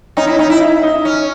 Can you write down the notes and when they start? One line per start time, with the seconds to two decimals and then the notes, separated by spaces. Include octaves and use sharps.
0.17 C#4 D#4
0.27 E4
0.39 C#4 D#4
0.50 E4
0.61 E4
0.83 D#4
1.05 C#4